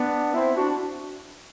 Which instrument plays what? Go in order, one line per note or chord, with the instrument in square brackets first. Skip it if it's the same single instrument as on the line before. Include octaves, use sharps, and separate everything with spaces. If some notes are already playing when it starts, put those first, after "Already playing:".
Already playing: [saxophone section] B3 D4
C4 E4
D4 F#4